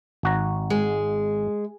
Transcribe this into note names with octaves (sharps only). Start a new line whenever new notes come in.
G#1 F#4 A#5
G#3